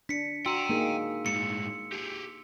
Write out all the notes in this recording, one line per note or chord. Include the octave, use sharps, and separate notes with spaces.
D4 B6 C#7
F#4 G5 A#5 C6 E6 C#7
A#3 D#4 G#4
A2 G#3 C#7
G4 G#4